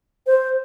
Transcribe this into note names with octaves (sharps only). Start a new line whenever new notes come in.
C5